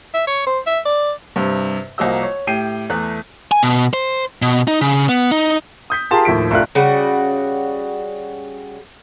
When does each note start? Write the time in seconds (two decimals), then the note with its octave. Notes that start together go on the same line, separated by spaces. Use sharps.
0.14 E5
0.27 C#5
0.46 C5
0.67 E5
0.85 D5
1.36 G2 C3
1.98 C2 F3 A#3 F#4 D#5 E6
2.23 C#5
2.47 A2 G4 G5 C7 D#7
2.90 E2 A3 F#6
3.52 G#5
3.63 B2
3.94 C5
4.42 B2
4.68 D#4
4.81 C#3
5.09 B3
5.31 D#4
5.90 D#6 G6 B6
6.11 F4 G4 G#4 A#4 A5 C6
6.25 D#2 A2 F3 B6 D7
6.51 C2 A3 D4 F4 F#6
6.75 C#3 G3 F#4